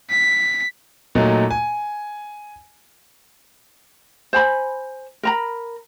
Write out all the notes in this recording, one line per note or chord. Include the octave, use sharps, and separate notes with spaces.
B6
A#2 F#3 A3 D#4
G#5
C5 G#5 B5
A#4 A#5 B5